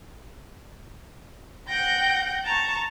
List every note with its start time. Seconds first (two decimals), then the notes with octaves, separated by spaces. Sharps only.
1.67 F#5 G5 G6 A#6
2.45 A5 A#5 C#6